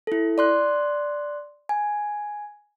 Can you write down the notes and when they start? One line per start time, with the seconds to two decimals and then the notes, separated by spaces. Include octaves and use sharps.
0.07 E4 A4
0.38 D5 C6 F#6
1.69 G#5